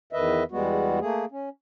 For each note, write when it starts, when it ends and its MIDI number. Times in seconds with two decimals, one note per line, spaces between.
0.13 0.44 40
0.13 0.44 51
0.13 0.44 71
0.13 0.44 75
0.13 0.44 76
0.52 0.99 40
0.52 0.99 55
0.52 0.99 56
0.52 0.99 59
0.52 0.99 66
1.00 1.25 57
1.00 1.25 58
1.00 1.25 68
1.31 1.49 61